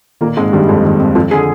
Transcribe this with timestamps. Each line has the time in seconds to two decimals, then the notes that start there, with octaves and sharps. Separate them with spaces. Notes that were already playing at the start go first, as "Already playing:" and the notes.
0.21 A#2 D#3 A#3
0.37 G#2 G#3 C4
0.53 G2 D#3 G3
0.68 F2 F3 G#3
0.85 D#3
1.00 C4
1.15 F2 F3 C4
1.31 D3 G#4